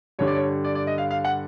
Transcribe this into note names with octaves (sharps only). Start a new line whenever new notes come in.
G2 D3 G3 C#5
D5
C#5
D5
D5
D#5
F5
F5
F#5